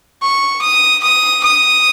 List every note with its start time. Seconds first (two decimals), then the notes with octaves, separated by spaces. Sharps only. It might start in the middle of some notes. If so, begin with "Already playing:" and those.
0.22 C#6
0.62 D#6
1.03 D#6
1.44 D#6